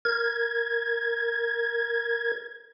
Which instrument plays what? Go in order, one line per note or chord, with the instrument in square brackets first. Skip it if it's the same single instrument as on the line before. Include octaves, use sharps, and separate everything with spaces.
[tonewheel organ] A#4 G#6